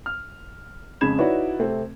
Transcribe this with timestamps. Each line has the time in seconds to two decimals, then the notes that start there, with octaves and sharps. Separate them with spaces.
0.06 F6
1.01 F2 C#3 G#3 B5 G#6 E7
1.18 D#4 E4 F#4 B4 C#5 D5
1.59 C3 A3 C4